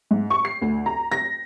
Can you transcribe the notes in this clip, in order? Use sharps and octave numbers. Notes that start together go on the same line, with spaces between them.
G#2
C#6
C7
D2
A#5
A#6